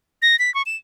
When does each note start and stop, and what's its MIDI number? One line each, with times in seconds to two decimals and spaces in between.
0.22 0.38 94
0.39 0.53 95
0.54 0.62 85
0.66 0.76 100